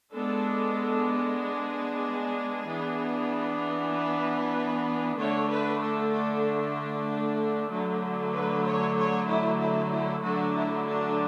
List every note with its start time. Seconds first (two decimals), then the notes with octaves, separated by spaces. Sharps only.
0.13 G#3 B3 D4 A4
1.41 G#4
2.67 E3 B3 D4
3.92 B4
5.18 D3 A3 D4 C#5
5.50 B4
5.81 A4
6.13 A4
7.71 D3 F#3 A3
8.34 B4
8.65 C#5
8.97 C#5
9.28 E4
9.59 E4
9.91 E4
10.23 D3 F#3 A3 D4 F#4
10.54 E4
10.86 D4